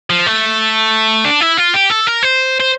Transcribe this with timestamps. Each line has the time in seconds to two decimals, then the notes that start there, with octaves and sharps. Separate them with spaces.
0.10 F3
0.26 A3
1.25 D4
1.41 E4
1.57 F4
1.74 G4
1.90 A4
2.07 A#4
2.23 C5
2.60 C5